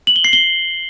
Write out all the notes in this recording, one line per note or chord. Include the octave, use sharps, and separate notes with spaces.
F#7
G7
C7
G7